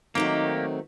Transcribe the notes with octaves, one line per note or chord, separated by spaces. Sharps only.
D#3 F#3 A3 A#3 C4 D#4 G4